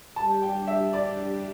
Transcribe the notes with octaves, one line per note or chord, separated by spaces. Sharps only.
G3 D4 G4 A5
G5
E5
D5